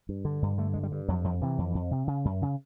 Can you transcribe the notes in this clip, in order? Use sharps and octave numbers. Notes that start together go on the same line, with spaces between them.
G2
D3
G2
D3 A3
G2 G#3
G3
G2
F2 F#3
F2 F3
C3 E3
F2
F2
C3
C#3
F#2
C#3